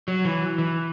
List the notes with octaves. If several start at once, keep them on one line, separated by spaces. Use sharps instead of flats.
F#3
E3
E3